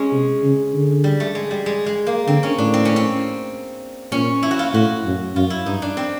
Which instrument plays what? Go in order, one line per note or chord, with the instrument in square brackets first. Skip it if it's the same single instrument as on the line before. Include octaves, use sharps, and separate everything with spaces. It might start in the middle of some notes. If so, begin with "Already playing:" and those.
Already playing: [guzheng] G#3 C#4
[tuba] C3
C#3
D3
[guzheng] G3
A3
G#3
G3
G#3
G#3
A#3
[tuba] D3 [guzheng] C4
[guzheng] C#4
[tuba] A2 [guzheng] D4
[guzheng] C4
C#4
C4
[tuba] A#2 [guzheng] C#4
[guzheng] E4
F#4
F4
[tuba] A2 [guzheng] F#4
[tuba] F#2
[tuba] F#2 [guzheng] F4
[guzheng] E4
[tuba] G2 [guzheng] D#4
[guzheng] D4
C4